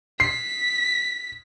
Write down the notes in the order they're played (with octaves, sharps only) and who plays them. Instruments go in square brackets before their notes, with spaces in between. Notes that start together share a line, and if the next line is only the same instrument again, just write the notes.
[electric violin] B6 [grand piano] C7